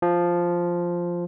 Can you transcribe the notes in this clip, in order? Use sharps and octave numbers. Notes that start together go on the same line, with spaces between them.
F3